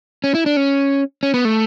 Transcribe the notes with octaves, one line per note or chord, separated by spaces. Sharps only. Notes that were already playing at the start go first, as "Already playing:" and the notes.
C#4
E4
D4
C#4
C#4
B3
A3